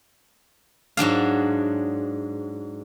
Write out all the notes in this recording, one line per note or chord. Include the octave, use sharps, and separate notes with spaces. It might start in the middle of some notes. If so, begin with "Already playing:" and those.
G#2 F#3 D4 F5